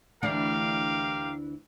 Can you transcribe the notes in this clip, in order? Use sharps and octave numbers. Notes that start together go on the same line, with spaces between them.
D2 E3 D4 G4 A#4 F5